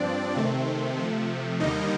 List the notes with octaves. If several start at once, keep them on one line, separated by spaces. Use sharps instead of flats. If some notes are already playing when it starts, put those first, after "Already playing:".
Already playing: G2 F3 C4 D4 D5
C3 D#3 A3 C4
C3 F3 A3
D#2 D3 G3 A#3 D#4 D#5